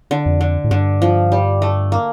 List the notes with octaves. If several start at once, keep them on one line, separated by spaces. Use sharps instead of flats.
D3
F2
D3
A2
G2 D3
F3
G3
A3
A#3